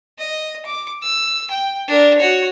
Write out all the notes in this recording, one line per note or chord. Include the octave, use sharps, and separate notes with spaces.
D#5
D6
E6
G5
D4 A#4
F#4 C#5